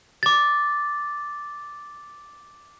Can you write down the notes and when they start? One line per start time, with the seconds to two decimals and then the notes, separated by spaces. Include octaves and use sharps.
0.23 D6 A6